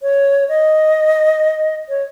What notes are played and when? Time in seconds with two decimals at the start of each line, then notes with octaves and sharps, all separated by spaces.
0.02 C#5
0.48 D#5
1.89 C#5